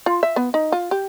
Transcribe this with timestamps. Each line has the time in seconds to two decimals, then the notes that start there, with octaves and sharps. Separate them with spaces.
0.06 F4
0.23 E5
0.36 B3
0.54 D#4
0.72 F4
0.91 G4